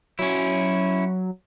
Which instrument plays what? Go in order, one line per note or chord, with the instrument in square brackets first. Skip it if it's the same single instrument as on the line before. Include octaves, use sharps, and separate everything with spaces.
[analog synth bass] F#3 [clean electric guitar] C#4 E4